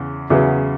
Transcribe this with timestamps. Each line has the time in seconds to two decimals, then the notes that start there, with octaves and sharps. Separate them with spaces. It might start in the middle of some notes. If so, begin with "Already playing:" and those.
Already playing: E2 C#3
0.30 E2 C#3 F#3 B3 E4